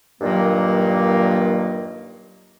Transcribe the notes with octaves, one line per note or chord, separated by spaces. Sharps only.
G2 A#2 D#3 F#3 A#3